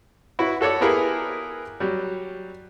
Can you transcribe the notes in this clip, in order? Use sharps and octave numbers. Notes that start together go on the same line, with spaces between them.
E4 F#4 B4
F#4 A4 C#5 D5 F#5
B3 E4 G4 G#4 A#4 B4
F#3 G3